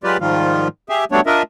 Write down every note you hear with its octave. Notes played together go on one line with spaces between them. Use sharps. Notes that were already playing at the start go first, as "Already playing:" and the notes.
F#3 G#3 F4 G4 B4 D5
G#2 D#3 F3 G3 F4
G4 G#4 E5
F#3 G3 A3 B3 D4 C#5
D4 F4 A#4 D#5 E5